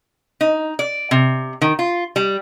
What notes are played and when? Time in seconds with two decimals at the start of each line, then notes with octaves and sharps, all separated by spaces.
0.41 D#4
0.79 D5
1.11 C3
1.61 D#3
1.79 F4
2.16 G3